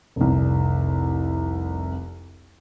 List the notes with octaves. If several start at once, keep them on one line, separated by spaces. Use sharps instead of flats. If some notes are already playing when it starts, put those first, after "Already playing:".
F1 C2